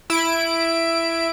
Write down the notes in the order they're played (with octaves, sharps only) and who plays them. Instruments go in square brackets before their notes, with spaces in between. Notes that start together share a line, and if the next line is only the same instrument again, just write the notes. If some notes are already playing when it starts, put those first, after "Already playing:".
[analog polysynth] E4 D7